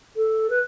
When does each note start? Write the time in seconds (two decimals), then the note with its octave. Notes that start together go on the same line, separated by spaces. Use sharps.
0.16 A4
0.49 B4